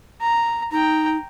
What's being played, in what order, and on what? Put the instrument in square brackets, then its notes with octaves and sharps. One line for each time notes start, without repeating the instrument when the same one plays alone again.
[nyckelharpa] A#5
[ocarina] D#4 [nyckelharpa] G5 A#5